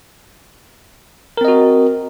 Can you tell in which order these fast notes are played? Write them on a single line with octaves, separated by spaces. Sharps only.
A#4 C4 D#5 F#4